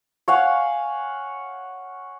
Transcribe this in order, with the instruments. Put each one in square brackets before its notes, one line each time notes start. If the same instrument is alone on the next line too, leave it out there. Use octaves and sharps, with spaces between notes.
[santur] C#5 F5 F#5 G#5